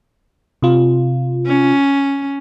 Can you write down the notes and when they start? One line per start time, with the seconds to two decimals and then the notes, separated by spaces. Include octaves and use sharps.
0.62 C3 F4
1.46 C#4